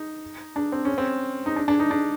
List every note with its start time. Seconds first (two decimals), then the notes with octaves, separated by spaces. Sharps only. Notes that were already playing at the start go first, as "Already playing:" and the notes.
Already playing: D#4
0.56 D4
0.72 C4
0.85 C#4
0.98 C4
1.46 D#4
1.56 D4
1.68 D4
1.79 D#4
1.91 D4